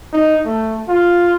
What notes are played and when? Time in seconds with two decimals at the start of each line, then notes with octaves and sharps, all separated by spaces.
0.13 D#4
0.46 A3
0.89 F4